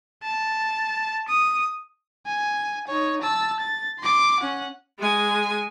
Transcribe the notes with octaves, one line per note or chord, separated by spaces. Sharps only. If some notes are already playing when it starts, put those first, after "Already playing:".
A5
D#6
G#5
D#4 C#5
A5 E6
A6
C6 D6
C#4 F#5
G#3 G#5